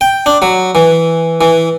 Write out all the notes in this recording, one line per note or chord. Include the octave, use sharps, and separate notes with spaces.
G5
D4
F#3
E3
E3